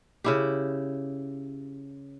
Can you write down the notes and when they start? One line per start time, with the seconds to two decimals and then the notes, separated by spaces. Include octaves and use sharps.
0.24 C#3 E4 G4